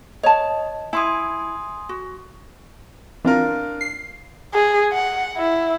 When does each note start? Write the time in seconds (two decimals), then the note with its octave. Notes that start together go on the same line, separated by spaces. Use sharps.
0.24 C#5 D#5 A5
0.93 E4 G#5 C6 D#6
1.89 F#4
3.25 E3 C4 D4 F4 A#4
3.81 C7
4.54 G#4
4.92 F#5
5.37 E4